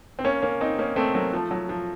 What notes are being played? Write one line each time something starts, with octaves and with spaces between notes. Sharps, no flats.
C4
A#3 C#4
A#3 C#4
C4 D#4
A#3 C#4
A3 C4
F#3 A#3
F3 A3
F#3
F3